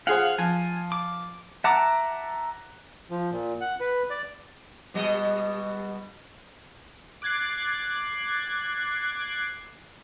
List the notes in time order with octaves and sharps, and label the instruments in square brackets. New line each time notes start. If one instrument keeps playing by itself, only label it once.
[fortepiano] F4 G#4 C5 [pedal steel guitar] F5 F#5
[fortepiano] F3 [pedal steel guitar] G#5
[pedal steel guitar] D6
[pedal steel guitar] E5 A5 A#5 [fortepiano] F#5 D6
[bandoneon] F3
A#2
F#5
B4
D5
[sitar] B2 G3 D#5
[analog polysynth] D6 F#6 G#6 A6 C7